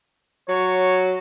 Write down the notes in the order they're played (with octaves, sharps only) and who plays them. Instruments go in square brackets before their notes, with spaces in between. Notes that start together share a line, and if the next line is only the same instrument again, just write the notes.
[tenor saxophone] F#3 [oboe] C#5